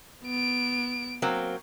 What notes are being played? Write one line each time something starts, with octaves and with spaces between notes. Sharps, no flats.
B3 D7
F#3 A#3 C4